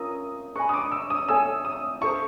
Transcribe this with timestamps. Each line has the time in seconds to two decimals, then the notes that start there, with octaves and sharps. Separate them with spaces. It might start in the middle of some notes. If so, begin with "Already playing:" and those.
Already playing: C#4 F4 A#4 D#6 E6
0.56 B4 D#5 G#5 B5 C#6
0.69 D#6
0.74 D6
0.92 E6
1.10 D#6
1.28 A4 C#5 E5 G#5 E6
1.65 D#6
2.01 E4 A4 C5 C#6